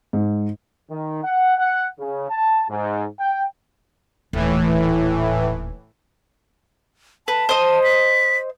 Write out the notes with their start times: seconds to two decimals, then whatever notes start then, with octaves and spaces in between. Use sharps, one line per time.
0.13 G#2
0.90 D#3
1.24 F#5
1.57 F#5
1.99 C#3
2.30 A5
2.70 G#2
3.19 G5
4.33 D#1 A2 E3
7.28 B4 A5
7.49 C5 D#5
7.83 B6